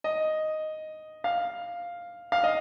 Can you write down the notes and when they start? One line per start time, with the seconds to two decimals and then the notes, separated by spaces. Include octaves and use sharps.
0.04 D#5
1.24 F5
2.32 F5
2.44 D#5